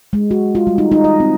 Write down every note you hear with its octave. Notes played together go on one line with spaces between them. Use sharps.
G#3
F#4
F4
G3
D#4
D#4
D#5
C4